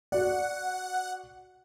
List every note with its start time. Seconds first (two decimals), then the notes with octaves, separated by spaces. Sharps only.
0.12 F#4 D5 F#5